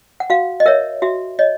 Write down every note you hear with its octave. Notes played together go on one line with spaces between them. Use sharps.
F#5
F#4 F5
D#5
A#4 C#5 E5
F#4 E5
C#5 D#5